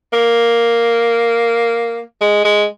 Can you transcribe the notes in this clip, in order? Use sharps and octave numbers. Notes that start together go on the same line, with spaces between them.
A#3
G#3
G#3